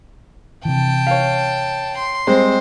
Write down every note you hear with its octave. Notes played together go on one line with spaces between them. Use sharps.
C3 E3 G5 A5
C#5 F5
C6
G3 G#3 C4 C5